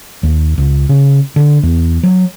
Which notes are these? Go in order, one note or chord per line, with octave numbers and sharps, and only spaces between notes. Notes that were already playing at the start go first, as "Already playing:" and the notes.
D#2
C#2
C#3
D3
E2
F#3